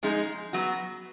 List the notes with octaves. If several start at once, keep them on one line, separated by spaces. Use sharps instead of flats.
F3 G#3 D#4 G#4
F#3 B3 F#4